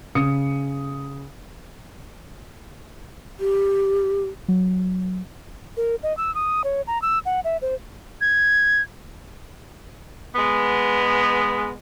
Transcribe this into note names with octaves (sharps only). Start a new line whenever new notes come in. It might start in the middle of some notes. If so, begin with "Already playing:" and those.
C#3 D#6 C#7
G4
F#3
A#4
D#5
E6
D#6
C#5
A#5
E6
F#5
E5
C5
G#6
G#3 B3